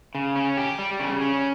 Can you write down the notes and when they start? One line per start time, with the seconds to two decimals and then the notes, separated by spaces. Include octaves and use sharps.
0.15 C#3
0.36 C#4
0.57 G4
0.78 G3
1.00 C#3
1.21 C#4